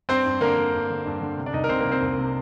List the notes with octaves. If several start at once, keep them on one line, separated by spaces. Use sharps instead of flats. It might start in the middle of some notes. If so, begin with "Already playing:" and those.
G2 C4 C5
G2
D3 A#3 A#4
D3
G2
D3
G2
D3
C3
D4 D5
C2 D#4 D#5
A#4
C3 C4 C5
A#3 A#4
C2
C4 C5
C2
C3